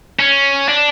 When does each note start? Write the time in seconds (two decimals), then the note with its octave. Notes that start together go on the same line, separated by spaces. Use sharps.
0.20 C#4
0.69 D4